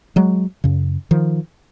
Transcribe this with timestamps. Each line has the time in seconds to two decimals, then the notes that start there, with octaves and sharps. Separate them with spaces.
0.16 F#3 G#3
0.64 F#2 C#3
1.11 D#3 F3